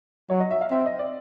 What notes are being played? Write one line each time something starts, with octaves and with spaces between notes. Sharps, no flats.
F#3 C#5
D#5
E5
F5
C4 E5
D#5
D5